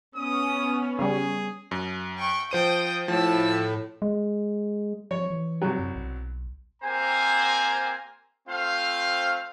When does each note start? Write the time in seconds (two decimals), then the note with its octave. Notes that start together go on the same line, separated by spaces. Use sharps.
0.16 B3 C#4 D#6
0.99 C#3 G3 G#4
1.71 F#2
2.18 G5 C#6
2.51 F3 C5 G5 D#6 D#7
3.08 A2 F3 A5 E6
4.02 G#3
5.11 F3 C#5
5.30 E3
5.62 C2 F#3
5.79 F#2
5.95 B1
6.83 A#3 C4 G4 C5 G#5 A#5
8.48 A3 C4 F4 C5 F5